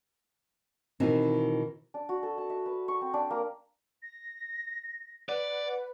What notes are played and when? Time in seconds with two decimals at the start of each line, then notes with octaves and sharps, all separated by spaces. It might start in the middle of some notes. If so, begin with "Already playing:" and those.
1.00 B2 D#3 E3 C4
1.94 D4
2.09 F#4
2.23 A4
2.38 A5
2.50 E5
2.66 B4
2.88 C#6
3.01 C4
3.14 D4
3.30 A#3
4.02 A#6
5.29 B4 D5 F#5